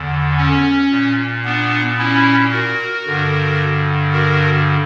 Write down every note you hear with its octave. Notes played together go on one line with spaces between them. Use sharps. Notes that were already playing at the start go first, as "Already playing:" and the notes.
Already playing: E2 D3
C#4
A#2
B3 D4
C#4 E4
F#4 A#4
G2 D3
F#4 A#4